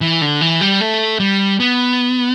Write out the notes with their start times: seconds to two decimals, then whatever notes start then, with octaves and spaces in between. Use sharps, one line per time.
0.01 E3
0.21 D3
0.41 E3
0.61 G3
0.81 A3
1.20 G3
1.60 B3